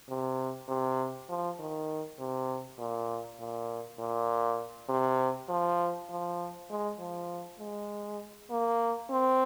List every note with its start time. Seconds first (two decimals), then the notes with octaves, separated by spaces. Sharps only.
0.09 C3
0.69 C3
1.29 F3
1.60 D#3
2.19 C3
2.79 A#2
3.40 A#2
3.99 A#2
4.89 C3
5.49 F3
6.10 F3
6.70 G#3
7.00 F3
7.59 G#3
8.51 A#3
9.11 C4